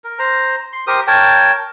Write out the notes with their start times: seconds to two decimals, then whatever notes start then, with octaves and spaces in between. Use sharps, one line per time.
0.04 A#4
0.19 C5 A#5
0.73 C6
0.87 G4 A#4 C5 D#6
1.07 A#4 C#5 G5 A5